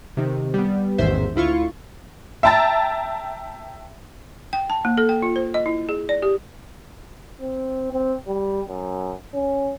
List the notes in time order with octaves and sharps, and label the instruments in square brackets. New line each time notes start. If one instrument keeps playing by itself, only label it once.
[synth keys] C3 D#3
G3 B3
A1 E2 G#2 D#3 C5 E5
D2 E4 F4 C#6
[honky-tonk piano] E5 G5 A5 A#5 A6
[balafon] G5
A5
A#3
A4
G5
F4
C5
D#5
E4
G#4
D5
G4
[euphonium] C4
C4
G3
F#2
C#4